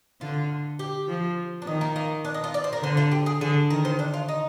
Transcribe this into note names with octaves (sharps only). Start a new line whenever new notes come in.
D3 F4
G4
F3
D4
D#3 D#4
A#3
A#3
D4
D#4
F4
D5
C5
A#4
D3 C5
F4
G4
G#4
D3 G#4
D#3 A#4
C5
D4
F4
D#4